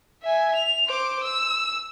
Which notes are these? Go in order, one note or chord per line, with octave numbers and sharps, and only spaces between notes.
E5 G#5
F7
C5 D6
E6